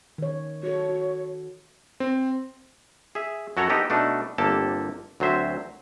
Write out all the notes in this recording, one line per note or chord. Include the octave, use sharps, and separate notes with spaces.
D#3 C#5
F#4 A4 C#5
F#4
C4
G#4 E5
F#2 F#4 A4 C#5 F#5 A#5
B3 D#4 G4 A4
B2 A3 D4 D#4
G1 C3 A#3 G4 A4 A5
D2 F#3 C4 C5 E5